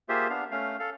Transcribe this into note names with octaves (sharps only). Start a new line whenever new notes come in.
A#3 F4 G4 G#4 C5 E5
B3 D4 F5
A3 C#4 F5
A4 F5